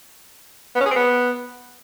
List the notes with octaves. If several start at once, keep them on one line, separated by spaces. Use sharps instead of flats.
B3
C#4
G#4
C4
B3